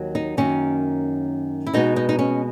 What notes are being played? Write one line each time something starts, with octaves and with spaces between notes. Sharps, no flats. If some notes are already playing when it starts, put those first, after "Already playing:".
Already playing: D#2 D#3 F#3
D#4
F#2 D#3 A#3 C#4
E4
B2 G#3 B3 D#4
D#4
D#4
C#4